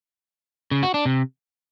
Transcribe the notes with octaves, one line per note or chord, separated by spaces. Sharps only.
C#3
F#4
D4
C3